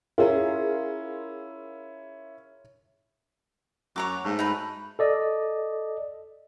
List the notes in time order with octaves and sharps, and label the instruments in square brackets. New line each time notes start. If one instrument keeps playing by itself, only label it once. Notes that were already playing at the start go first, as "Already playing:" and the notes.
[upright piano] C#4 E4 [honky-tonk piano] F4 G#4 A#4
[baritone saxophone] F#2 [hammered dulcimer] F#4 E5 F#5 [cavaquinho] C#5 A#5 D6
[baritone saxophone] G#2 [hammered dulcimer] A3
[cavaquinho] D#4 B4
[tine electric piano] A4 D5 D#5